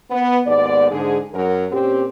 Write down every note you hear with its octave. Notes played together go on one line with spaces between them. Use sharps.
B3
D#2 G#2 B3 D5
G#2 D3 G#4
F#2 F#3 A#4
A#2 C4 C#4 G4